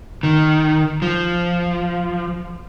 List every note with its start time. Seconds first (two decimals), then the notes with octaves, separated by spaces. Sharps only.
0.23 D#3
1.02 F3